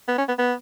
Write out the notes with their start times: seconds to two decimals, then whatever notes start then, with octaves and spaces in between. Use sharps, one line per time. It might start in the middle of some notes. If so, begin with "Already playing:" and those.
0.08 B3
0.18 C#4
0.28 B3
0.38 B3